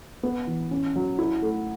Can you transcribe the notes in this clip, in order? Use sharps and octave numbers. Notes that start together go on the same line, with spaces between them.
B3
E3
C#4
F#3
E4
A3